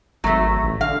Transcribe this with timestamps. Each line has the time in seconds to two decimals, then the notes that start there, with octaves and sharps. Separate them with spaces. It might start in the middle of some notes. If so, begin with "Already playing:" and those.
0.24 G#1 F#3 A3
0.63 A1
0.81 D3 F5